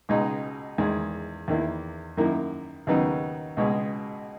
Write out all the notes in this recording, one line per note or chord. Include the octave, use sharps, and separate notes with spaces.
C#2 B2 G#3 D#4
E2 D#3 G#3
E2 D#3 A#3 E4
F#2 D#3 A#3 E4
D#2 C#3 F#3 B3 D#4
C#2 B2 G#3